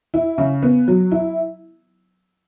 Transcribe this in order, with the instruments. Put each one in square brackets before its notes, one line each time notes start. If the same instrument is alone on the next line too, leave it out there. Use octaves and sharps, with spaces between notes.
[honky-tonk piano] E4
C#3
B3
F#3
E4